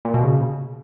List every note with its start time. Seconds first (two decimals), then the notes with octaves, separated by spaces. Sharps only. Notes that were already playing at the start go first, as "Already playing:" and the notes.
0.05 A#2
0.14 B2
0.24 C#3